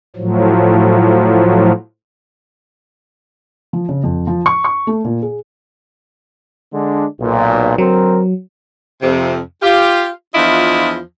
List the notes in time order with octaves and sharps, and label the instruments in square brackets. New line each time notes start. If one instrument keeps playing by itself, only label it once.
[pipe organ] A2 F3 F#3
[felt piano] F3
C#3
F2
F3
C#6
C#6
A3
A#2
G#4
[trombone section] D3 G#3 D4
B1 A#2
[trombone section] D3 C4 A#4 [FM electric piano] F#3
[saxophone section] F2 C3
F4 G4
E2 F3 D4 E4 F4 D#5